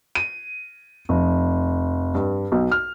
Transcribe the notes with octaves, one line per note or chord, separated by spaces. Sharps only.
D#7
F1
G2
B1
F6